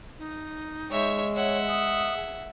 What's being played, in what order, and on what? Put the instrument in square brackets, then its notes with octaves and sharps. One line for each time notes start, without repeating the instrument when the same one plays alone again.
[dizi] D#4
[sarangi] G#3 [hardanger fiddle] C#5 E5
[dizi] C#5 [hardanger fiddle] E5 F#5
[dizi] D#6
G#4